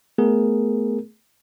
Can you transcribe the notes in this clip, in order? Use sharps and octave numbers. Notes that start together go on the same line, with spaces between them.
A3 B3 G#4 A#4